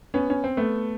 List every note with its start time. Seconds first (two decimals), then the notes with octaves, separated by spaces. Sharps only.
0.14 B3 C#4
0.30 C#4
0.44 C4
0.57 A3 B3